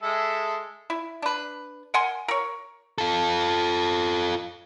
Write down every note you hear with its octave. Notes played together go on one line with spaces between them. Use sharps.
G#3 A4 E5
E4
D4 B4
A#4 F#5 G#5 C6
A#4 C#5
F4 A4